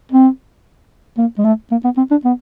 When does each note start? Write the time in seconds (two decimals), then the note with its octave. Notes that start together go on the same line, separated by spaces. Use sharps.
0.12 C4
1.18 A#3
1.38 G#3
1.44 A3
1.71 A#3
1.84 B3
1.97 C4
2.11 D4
2.25 B3